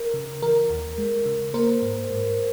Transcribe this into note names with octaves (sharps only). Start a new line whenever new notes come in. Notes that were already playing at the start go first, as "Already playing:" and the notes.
Already playing: A#4
C#3
E3 A#4
D#2
G#3
C#3
A#3 A#4 C5
G#2
G#2